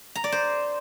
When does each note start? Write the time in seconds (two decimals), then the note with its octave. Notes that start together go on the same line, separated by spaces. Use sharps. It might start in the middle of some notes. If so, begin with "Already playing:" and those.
0.15 A#5
0.24 D5
0.32 C5